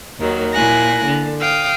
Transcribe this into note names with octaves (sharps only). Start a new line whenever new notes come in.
D#2 D#3 F#3
A#2 A#3 E4 G#5 F#6 A#6
D3
F5 G5 D#6